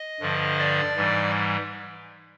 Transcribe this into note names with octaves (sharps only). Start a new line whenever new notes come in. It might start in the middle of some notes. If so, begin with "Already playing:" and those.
Already playing: D#5
G2 D3 F3
D5
G#2 E3 G3